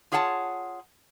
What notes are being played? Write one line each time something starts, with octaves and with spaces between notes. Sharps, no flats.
F4 G#4 C#5 F#5 G#5 A5